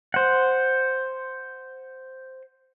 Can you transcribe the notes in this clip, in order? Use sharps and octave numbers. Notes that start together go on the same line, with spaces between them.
C5 F#5